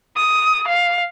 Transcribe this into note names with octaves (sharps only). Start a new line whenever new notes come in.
D#6
F5